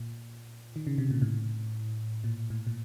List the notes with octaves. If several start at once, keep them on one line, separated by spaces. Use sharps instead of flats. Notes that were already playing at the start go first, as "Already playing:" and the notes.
Already playing: A#2
D#3
C#3
C3
A#2
A2
A#2
A2
A#2